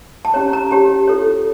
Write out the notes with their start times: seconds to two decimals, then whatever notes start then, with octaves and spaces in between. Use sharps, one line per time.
0.25 A5
0.34 C#4 G4 C#5 A#5
0.53 A#5
0.70 C#4 G4 C#5 A5
1.07 F4 A4 C#5